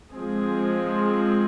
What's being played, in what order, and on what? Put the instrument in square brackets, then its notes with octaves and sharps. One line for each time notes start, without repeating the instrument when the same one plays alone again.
[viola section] F3 G#3 C4 G#4